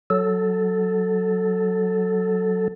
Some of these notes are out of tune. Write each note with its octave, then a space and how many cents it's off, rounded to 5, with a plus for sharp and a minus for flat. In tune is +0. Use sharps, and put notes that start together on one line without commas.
F#3 +0 A4 +0